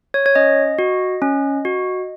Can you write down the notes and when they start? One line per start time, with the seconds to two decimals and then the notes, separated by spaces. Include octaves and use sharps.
0.14 C#5
0.26 C#5
0.35 C#4 D#5
0.79 F#4
1.22 C#4
1.65 F#4